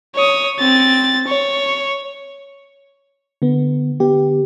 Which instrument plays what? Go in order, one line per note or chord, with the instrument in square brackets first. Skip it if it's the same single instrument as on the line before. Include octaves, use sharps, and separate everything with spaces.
[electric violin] C#5 D#6
C4 A6
C#5
[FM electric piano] D3 B3
D3 B3 G4